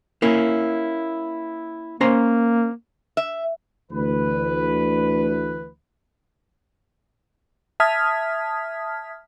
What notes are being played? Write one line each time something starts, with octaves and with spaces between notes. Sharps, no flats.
A#3 C#4 E4
A#3 C#4 C5 A#5
E5
D2 E3 B4
E5 A5 D#6 F6 G#6 B6